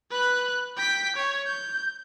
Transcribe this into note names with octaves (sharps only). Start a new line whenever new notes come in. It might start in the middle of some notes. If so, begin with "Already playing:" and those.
B4 F#6
G5 B6
C#5
G6